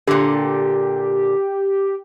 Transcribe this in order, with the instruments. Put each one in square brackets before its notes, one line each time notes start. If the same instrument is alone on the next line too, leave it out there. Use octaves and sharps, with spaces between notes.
[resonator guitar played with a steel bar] A#2 D3 [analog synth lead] G4